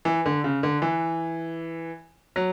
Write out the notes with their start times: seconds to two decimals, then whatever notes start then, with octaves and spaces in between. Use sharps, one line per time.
0.05 E3
0.26 D3
0.44 C#3
0.63 D3
0.82 E3
2.36 F#3